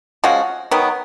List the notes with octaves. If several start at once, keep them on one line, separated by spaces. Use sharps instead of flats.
F3 G#3 C#4 F#4
D#3 F#3 B3